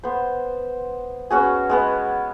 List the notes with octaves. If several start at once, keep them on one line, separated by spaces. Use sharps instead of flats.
B3 C5
B3 C#4 F#4 G#4
G#3 B3 G#5